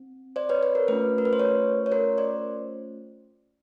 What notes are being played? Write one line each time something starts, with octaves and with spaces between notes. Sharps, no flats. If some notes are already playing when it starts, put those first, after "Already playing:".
Already playing: C4
C5 D5
B4 C#5
B4
A#4
A3 C#4 F4 B4
A#4
B4
C5
B4 C#5
C#5
A#4 C5
C5 D5